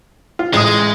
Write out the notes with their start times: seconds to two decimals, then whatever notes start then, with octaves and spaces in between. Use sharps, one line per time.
0.39 F4
0.54 A1 G#3 D#6